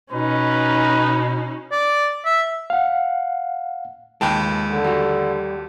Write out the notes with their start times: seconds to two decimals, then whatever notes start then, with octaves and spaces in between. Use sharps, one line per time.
0.12 B2 C#4 D#4 B4
1.72 D5
2.25 E5
2.70 F5 F#5
4.21 D#2 G#3 F4 B4 G5 A5
4.69 D3
4.84 G3 F#4